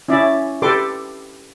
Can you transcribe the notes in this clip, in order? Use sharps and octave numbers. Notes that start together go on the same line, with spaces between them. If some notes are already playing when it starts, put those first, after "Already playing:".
C#4 E4 D5 E5
G4 A4 B4 D5 C6 D6